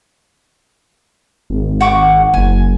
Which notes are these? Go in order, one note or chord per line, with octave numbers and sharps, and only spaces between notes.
G#1
F#5 C#6 D6
F#1 G#5